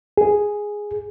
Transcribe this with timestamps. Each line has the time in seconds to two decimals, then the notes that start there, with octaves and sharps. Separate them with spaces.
0.18 G#4